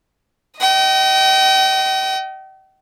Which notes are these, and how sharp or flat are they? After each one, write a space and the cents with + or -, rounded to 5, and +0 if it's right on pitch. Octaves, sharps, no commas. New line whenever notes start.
D#5 +0 G5 -40